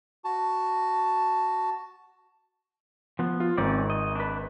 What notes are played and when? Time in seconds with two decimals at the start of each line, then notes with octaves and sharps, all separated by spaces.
0.24 F#4 A5
3.19 F3 B3
3.40 F4
3.57 G#1 G#2 C4 C#4 D5
3.90 D#5
4.15 D4 B4